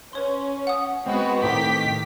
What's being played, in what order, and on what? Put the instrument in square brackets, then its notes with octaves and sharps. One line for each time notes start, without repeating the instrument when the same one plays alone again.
[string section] C#4 [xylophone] B4 C#5 C6
[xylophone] F#5 D#6
[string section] G#3 B3 F#4 [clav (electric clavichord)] C4
[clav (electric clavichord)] A2 C4 A#5 [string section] D#3 G4 B6